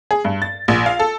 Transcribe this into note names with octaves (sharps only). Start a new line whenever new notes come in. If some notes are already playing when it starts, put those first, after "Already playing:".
G#4
G2
A6
A#1
F5
A4